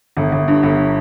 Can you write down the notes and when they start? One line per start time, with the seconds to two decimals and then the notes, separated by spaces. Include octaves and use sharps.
0.17 G1
0.32 G1
0.48 G2
0.63 G1